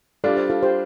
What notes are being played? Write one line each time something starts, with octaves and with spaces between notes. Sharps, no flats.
G3 D4 F4 A4 D5
C5 F5
F4 A4
G4 C5